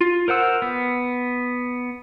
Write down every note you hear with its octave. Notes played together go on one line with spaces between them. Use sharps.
F4
A#4 C5 F#5 E6
B3